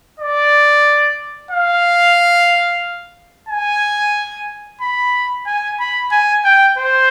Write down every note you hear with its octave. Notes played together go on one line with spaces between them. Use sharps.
D5
F5
G#5
B5
G#5
B5
G#5
G5
C5